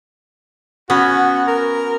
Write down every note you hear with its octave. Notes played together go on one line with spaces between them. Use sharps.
B3 C#4 F#4
A#4